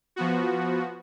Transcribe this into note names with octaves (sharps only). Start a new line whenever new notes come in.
F3 B3 F#4